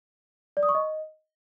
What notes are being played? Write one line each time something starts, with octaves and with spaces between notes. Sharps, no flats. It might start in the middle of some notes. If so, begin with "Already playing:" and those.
D5
D#6
C#6
D#5